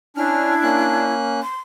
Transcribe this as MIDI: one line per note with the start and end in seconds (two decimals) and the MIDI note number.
0.17 0.54 61
0.17 1.05 62
0.17 1.13 64
0.17 0.54 89
0.63 1.40 58
0.63 1.40 61
0.63 1.40 90
1.42 1.59 84